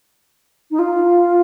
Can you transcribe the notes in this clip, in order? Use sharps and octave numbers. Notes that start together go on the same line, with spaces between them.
D#4
F4